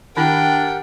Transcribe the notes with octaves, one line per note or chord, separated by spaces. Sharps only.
D#3 D4 E4 G4 A#4 F#5 G5 B5